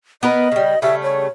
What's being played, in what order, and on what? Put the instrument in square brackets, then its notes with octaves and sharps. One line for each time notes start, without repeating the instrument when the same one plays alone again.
[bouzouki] B3 A#4 B4 [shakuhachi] D#5
[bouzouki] C#3 G3
[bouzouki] C#3 G3 A3 [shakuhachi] E5
[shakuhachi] C#5